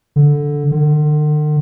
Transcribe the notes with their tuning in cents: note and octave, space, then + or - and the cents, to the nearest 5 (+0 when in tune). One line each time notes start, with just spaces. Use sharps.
D3 -5
D3 +45